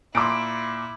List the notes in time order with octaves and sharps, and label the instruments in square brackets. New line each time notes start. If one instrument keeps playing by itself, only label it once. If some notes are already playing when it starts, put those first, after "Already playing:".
[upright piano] A#2 C6 [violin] E4 [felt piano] D6 E6 D7